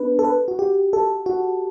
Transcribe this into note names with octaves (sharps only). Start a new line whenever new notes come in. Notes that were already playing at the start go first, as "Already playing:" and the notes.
Already playing: B3 D4 B4
A4
B4
F#4
G4
A4
F#4